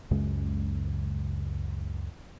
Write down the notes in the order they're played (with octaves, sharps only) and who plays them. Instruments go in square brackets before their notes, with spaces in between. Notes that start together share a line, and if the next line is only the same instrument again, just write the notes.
[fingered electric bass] C#2 F#2 C#3 G#3